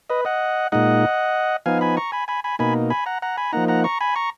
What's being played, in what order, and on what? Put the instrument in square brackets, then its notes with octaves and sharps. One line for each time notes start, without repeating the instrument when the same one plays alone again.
[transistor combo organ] B4 D#5
D#5 F#5
A#2 G#3 D#4 D#5 F#5
F3 B3 D#4 F5 G#5
G#5 B5
A#5 C#6
G#5 B5
G#5 B5
G#5 B5
B2 A#3 D#4 G#5 B5
G#5 B5
F#5 A#5
F#5 A#5
G#5 B5
F3 A#3 D#4 F#5 A#5
F#5 A#5
A#5 C#6
G#5 B5
A#5 C#6